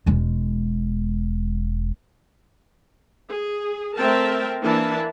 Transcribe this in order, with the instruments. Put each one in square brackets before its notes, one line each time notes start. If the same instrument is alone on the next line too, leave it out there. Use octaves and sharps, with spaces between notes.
[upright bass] E1 G#3
[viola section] G#4
A3 C4 A#4 E5 G5 A5
E3 A#3 D4 E4 E5 A5